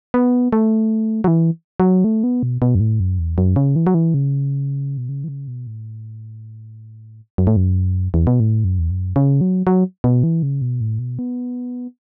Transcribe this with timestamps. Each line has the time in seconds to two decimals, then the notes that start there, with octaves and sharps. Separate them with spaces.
0.14 B3
0.53 A3
1.24 F#3
1.28 E3
1.80 F#3
2.04 A3
2.24 B3
2.43 B2
2.62 B2
2.75 F#2
2.80 A2
3.00 F#2
3.19 E2
3.38 F#2
3.56 C#3
3.76 E3
3.87 F#3
3.94 E3
4.14 C#3
4.98 B2
5.09 C#3
5.24 E3
5.28 C#3
5.48 B2
5.67 A2
7.38 F#2
7.47 A2
7.57 F#2
8.14 E2
8.27 B2
8.40 A2
8.64 F#2
8.79 E2
8.90 F#2
9.16 C#3
9.41 F#3
9.67 F#3
10.04 B2
10.23 E3
10.43 C#3
10.62 B2
10.81 A2
10.99 B2
11.19 B3